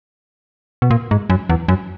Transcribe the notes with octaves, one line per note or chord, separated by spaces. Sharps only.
B2
A#2
G#2
F#2
E2
F#2